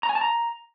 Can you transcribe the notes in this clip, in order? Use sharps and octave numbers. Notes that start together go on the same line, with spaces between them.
A#5
G#5
A5
A#5